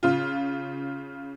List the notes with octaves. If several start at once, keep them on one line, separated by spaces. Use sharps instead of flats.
C#3 F4